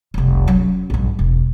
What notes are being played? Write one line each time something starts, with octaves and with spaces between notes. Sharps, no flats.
F1 C2
F#3 C#4
A#1 G2
E1